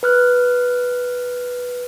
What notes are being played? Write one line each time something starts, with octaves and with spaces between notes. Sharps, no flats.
B4 F6 F#6